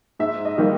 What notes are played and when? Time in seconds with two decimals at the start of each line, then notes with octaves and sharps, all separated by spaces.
0.19 G#2 E5
0.45 D#5
0.58 D#3 G3 A#3